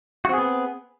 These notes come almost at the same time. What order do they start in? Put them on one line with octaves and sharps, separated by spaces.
F#4 C4 G#4 B3